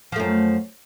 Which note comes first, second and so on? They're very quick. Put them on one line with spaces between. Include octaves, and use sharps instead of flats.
F3 A3 F#2